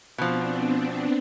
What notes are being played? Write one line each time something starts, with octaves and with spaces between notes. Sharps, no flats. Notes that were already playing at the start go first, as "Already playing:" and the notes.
B2 F3 B3 C4 D4